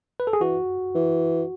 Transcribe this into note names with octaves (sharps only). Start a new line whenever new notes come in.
B4
A4
G#4
E3 F#4
E3